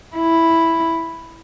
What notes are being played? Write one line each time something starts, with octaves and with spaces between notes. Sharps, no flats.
E4